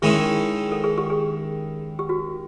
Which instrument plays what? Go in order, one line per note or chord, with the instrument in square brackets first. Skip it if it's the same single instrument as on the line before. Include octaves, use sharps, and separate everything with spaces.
[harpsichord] D#3 G#3 C#4 E4 [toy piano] G#4
[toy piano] A4
G#4
G4
G#4
G4
F#4